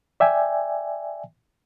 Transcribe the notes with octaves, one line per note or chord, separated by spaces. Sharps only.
D5 E5 G5 G#5